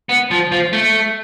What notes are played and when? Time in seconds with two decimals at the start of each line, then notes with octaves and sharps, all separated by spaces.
0.09 B3
0.31 F3
0.52 F3
0.73 A3